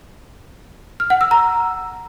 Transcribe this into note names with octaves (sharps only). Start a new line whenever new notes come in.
F6
F#5
E6
A#5